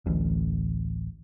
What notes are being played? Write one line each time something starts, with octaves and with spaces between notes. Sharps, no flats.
D1 A1